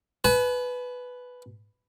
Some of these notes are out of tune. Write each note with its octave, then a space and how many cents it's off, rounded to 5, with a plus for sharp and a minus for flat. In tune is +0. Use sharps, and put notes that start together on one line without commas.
B4 +5 G#5 +45